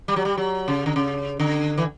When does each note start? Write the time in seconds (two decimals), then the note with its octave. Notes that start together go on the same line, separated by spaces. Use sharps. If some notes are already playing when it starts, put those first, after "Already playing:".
0.08 G3
0.16 F#3
0.25 G3
0.37 F#3
0.68 C#3
0.86 D3
0.96 C#3
1.40 D3
1.78 E3